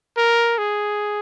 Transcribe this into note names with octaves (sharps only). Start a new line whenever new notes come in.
A#4
G#4